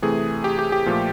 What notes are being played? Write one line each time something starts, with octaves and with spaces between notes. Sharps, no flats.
C3 E3 A3 G#4
G4
G4
G4
A#2 F3 A3